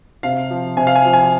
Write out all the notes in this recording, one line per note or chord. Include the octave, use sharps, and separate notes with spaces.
C3 F5
F3
C3 G#5
F5
G#5
F3
G#5